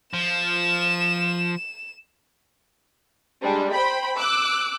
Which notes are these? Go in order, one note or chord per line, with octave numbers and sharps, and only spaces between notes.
F3 E7
G3 G#3 D4
C5 G5 B5
D6 E6 F#6